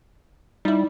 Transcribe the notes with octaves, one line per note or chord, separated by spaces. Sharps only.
G3 D#4 E4